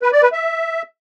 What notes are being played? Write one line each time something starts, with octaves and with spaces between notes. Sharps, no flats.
B4
D5
B4
E5